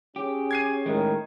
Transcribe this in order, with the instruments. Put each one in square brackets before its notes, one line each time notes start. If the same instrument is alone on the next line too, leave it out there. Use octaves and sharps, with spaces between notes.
[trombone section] C#4 G#4 [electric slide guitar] G4
[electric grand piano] G#6 C7 D#7
[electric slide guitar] A2 G#3 A3 [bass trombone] D#3